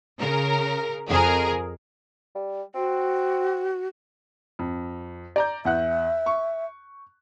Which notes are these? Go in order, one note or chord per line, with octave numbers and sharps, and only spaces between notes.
C#3 A#4
F2 G#4 A#4
G3
C4 F#4
F2
D5 A#5 G6
E2 E5 F#5 F#6
C#6